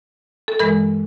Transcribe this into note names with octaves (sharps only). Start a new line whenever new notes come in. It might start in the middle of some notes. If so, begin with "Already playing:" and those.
A4
G2 E3 G#3 A#4